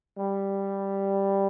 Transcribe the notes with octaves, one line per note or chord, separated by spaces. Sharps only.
G3